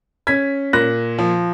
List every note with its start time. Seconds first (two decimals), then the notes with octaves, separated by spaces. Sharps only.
0.27 C#4 G#6 B6
0.73 A#2 F#6 A#6
1.18 F3